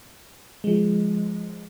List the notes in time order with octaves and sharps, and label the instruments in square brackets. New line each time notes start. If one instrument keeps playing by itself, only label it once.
[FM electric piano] F3 G#3